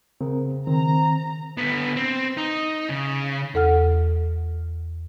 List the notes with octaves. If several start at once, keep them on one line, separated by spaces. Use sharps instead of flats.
C#3 C4 A#4
D#3 C4 A#5
D3 B3
C4
D#4
C#3
E2 A4 F#5 F6